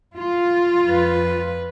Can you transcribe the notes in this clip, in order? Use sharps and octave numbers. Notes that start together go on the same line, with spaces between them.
F4
F2 B4